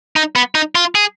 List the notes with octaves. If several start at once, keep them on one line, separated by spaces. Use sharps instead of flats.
D#4
B3
D#4
F4
G#4